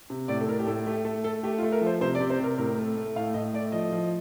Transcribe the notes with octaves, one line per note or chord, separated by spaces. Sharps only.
C3
A2 D5
A4
A2 A#4
G4
A2 A4
A3 G4
A3 A4
A3 A4
A3 G4
F4
A3
A#4
F3
C5
C3 C5
D5
C3
C5
C3 A#4
A2 A#4
A3
A3
A2 F5
A2 D#5
A3 D5
F3 D#5
F3